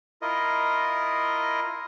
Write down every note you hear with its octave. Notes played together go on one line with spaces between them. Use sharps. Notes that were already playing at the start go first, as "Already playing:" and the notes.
E4 F4 A#4 D#5